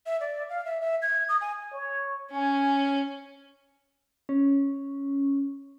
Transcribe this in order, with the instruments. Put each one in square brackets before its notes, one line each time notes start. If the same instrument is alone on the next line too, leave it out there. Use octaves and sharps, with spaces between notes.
[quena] E5
D5
F5
E5
E5
G#6
D#6
G#5
[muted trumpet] C#5
[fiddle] C#4 [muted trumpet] G#5
[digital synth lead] C#4